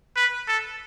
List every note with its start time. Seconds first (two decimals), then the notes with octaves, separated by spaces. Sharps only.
0.16 B4
0.48 A4